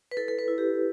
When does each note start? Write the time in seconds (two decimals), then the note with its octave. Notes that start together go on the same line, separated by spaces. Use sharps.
0.11 B4
0.17 E4 A4
0.28 A4
0.39 B4
0.48 E4
0.58 G4